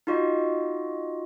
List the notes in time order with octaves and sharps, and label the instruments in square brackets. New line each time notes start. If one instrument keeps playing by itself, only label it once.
[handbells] D#4 F4 F#4 D#5